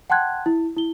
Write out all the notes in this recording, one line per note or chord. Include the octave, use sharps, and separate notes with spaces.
F#5 G5 A5 C6 F#6 G#6
E4
E4 G7